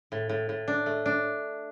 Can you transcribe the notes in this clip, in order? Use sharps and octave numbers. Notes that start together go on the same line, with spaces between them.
A2
A2
A2
D4
A3
D4